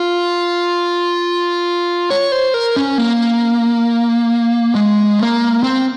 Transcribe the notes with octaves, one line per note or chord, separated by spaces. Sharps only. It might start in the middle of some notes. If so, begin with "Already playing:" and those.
Already playing: F4
C#5
C5
A#4
C#4
A#3
G#3
A#3
C4